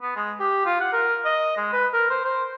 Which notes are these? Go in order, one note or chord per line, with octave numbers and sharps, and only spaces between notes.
B3
G#3
G4
F4
F#5
A#4
D#5
G#3
B4
A#4
C5
C5